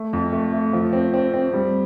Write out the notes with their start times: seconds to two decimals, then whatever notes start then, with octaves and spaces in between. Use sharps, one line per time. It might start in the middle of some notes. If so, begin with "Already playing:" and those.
Already playing: A3
0.13 F2
0.33 A3
0.53 A3
0.73 F3
0.93 C4
1.14 C4
1.34 C4
1.53 G3